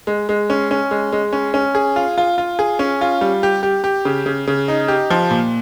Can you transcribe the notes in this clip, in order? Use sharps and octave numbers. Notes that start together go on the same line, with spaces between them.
G#3
G#3
C#4
C#4
G#3
G#3
C#4
C#4
G#4
F4
F4
F4
G#4
C#4
F4
G3
G4
G4
G4
C#3
C#3
C#3
D#4
G4
F3
A#2